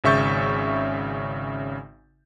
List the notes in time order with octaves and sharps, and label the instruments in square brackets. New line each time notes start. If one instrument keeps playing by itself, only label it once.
[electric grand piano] G#1 C#3 E5 C#6 G6 A6